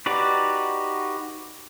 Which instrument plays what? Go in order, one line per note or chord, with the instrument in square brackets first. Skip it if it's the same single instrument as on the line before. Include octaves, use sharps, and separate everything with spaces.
[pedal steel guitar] D#4 F#4 G4 B4 D5